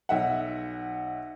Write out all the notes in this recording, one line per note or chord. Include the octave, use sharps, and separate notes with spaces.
B1 E5 F#5